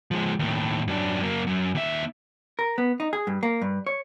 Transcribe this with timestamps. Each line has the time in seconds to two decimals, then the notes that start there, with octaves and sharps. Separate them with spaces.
0.11 F3 G#3
0.39 D#2 A2
0.88 F#2 D4
1.20 F#2 A#3
1.47 F#2
1.75 D#2 E5
2.59 A#4
2.78 B3
3.00 D#4
3.13 G#4
3.27 G2
3.43 A#3
3.62 G2
3.87 C#5